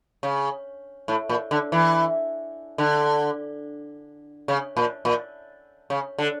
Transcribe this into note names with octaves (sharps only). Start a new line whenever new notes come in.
C#3
A2
A#2
D3
E3
D3
C#3
A#2
A#2
C#3
D3